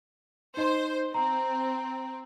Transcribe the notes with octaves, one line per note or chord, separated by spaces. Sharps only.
D#4 C5 D#5
C4 A#5